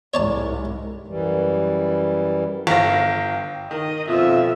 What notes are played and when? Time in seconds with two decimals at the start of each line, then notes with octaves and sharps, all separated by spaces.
0.14 C2 G#2 C#5 D5 A5
1.07 F#2 E3 G3
2.67 G1 F5 G5 A#6
3.71 D#3 A#4 D#5
4.08 F2 B2 F4 E5 D#6 E6